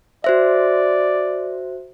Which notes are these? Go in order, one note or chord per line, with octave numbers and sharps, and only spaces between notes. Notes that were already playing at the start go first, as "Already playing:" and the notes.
F#4 C5 D5 E5